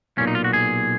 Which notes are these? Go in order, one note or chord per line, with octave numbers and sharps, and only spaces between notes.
B1 A#2 C#4
D#4
F4
F#4
G#4